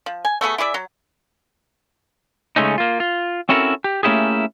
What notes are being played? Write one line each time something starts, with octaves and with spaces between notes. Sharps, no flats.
F3
G#5
A3 B3 F#4 G#4
E4 G#4 D5 E5
F#3
C#3 G#3 A3 C#4 D#4
A#3 F4
F4
C4 C#4 E4 F#4 A4 A#4
G4
A3 A#3 C#4 E4 G4 G#4